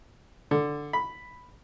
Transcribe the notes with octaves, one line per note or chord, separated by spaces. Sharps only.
D3
B5